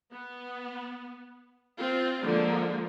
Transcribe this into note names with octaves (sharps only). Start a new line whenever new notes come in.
B3
C4 F4
D3 F3 G#3 A#3